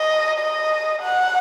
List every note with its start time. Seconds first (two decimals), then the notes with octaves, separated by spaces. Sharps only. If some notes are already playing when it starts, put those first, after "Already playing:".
Already playing: D#5
0.39 D#5
1.02 F#5